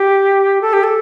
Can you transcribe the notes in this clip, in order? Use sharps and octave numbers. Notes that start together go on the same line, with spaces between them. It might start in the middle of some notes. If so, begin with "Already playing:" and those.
Already playing: G4
A4
G4
A4